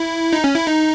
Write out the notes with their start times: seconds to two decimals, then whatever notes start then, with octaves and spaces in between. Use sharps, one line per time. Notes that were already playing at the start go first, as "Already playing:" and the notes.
Already playing: E4
0.33 D#4
0.44 C#4
0.55 E4
0.67 D#4